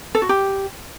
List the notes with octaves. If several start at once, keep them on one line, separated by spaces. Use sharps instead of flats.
A4
F#4
G4